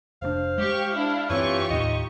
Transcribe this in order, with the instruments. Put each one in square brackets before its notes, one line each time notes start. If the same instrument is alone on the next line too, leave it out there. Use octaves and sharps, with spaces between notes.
[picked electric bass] F1 A#2 D4 [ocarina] C5 [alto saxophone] F5
[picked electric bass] G#3 [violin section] G4 C#6
[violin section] D4 E4
[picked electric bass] F#2 C4 [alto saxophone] E3 [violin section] F4 G4 C#6 [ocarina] C#5
[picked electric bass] D#2 A2 [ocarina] D#4 [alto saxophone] D#5